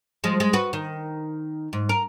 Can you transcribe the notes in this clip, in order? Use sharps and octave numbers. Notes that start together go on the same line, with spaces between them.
F3 G#3
G#3
F#4 B4
D#3
G#2
A#4